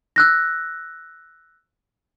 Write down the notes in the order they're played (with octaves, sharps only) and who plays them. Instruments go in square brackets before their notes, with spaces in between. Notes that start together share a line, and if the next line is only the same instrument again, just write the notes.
[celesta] E6 F#6 A#6